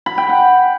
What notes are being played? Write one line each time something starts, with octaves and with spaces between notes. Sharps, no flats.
B5
G5
F#5